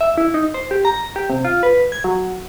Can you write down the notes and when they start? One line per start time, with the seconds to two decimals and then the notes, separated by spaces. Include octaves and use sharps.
0.01 E5
0.18 E4
0.34 D#4
0.54 C5
0.71 G4
0.85 A#5
1.16 G4
1.30 C3
1.45 F4
1.63 B4
1.92 G#6
2.04 F#3